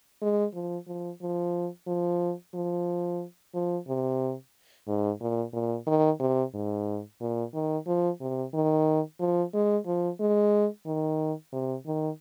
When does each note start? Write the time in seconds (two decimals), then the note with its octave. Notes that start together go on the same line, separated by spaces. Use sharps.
0.22 G#3
0.54 F3
0.87 F3
1.21 F3
1.87 F3
2.54 F3
3.54 F3
3.88 C3
4.87 G#2
5.21 A#2
5.53 A#2
5.87 D#3
6.20 C3
6.54 G#2
7.20 A#2
7.54 D#3
7.87 F3
8.21 C3
8.54 D#3
9.20 F3
9.54 G#3
9.86 F3
10.20 G#3
10.86 D#3
11.53 C3
11.86 D#3